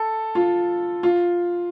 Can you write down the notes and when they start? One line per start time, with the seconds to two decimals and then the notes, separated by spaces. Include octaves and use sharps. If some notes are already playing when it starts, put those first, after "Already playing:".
Already playing: A4
0.35 F4
1.03 F4